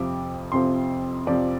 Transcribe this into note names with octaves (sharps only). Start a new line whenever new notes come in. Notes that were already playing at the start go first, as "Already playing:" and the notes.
Already playing: F2 C3 F3 D6
F2 C3 F3 C6
F2 C3 F3 D5